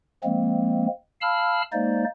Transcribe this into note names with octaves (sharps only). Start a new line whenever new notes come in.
F3 G#3 A#3 C4
F5 A5 B5 E6 F6
G#3 A#3 D#4 C5 D5